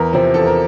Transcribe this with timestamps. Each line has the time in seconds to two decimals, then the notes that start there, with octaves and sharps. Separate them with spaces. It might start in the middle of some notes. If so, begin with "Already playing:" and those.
Already playing: E2 A#4
0.13 C3 F3 C4
0.34 E2 A4
0.47 A#4